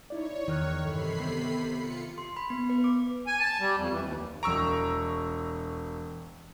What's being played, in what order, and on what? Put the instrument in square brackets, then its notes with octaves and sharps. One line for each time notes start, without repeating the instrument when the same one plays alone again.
[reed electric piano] D#4 E4 D5 [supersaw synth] C#5
[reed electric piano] E2 F6 F#6 [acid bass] D#3
[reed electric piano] G2 E3 [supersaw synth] C3 B5 C7 [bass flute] A4
[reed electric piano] B3
[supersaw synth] F4 C#7
[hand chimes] C6
B5
B3
B4
D6
[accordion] G#5
A5
G3
F2
E3
D#2
[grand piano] E1 D7 [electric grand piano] A#5 C#6 E6